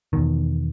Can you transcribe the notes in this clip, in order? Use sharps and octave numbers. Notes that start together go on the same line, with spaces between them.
E2 B2 D#3